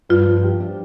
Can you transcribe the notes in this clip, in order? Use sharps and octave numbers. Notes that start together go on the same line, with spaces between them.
G2 F4
F3
G4
D4